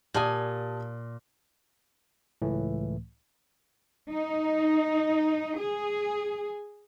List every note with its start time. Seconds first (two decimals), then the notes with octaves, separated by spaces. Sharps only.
0.14 A#2 G4 G#5 A5 D#6
2.42 C#2 A2 E3 A3
4.10 D#4
5.59 G#4